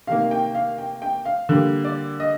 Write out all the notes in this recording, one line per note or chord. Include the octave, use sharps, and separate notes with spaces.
C3 D#3 A#3 F5
G5
F5
G5
G5
F5
D3 G3 A#3
D5
D#5